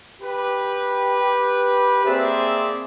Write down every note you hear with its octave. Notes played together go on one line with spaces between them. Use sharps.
G4 B4
A#3 C4 G#4 C5 D5 E5